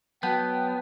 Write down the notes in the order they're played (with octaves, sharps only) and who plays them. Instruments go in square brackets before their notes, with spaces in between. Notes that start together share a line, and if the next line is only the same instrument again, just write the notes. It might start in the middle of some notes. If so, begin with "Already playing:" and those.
[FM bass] F#3 [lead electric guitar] B3 [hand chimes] F#5 A5 G6 [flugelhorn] G5